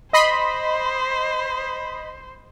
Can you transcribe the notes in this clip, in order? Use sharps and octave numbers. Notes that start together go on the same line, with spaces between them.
C5 D#5 B5 C6